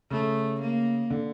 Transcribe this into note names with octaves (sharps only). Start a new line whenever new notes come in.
C#3 A3
A#3
D3